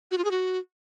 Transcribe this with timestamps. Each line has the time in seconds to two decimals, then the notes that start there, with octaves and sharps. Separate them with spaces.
0.11 F#4
0.18 F4
0.24 G#4
0.31 F#4